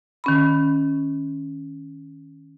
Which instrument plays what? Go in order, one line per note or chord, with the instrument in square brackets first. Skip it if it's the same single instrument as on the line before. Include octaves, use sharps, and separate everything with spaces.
[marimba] D#3 C#4 B5